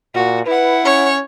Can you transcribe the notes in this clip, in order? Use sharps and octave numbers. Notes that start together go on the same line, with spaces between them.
A#2 F#4
E4 B4 F#5
C#4 C#5